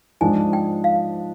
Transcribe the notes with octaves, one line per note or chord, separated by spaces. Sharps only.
G#2 F3 G#3 D4 G#5
G5
F5